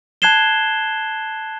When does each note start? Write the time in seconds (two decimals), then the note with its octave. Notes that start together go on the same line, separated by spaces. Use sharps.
0.22 A5 F#6 G#6 C7 E7 G7